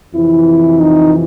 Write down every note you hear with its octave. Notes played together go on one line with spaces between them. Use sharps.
F2 C3 E3 E4
D#4